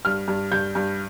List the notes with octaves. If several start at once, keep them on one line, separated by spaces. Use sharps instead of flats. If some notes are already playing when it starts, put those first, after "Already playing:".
G2 F6
G2
G2 G6
G2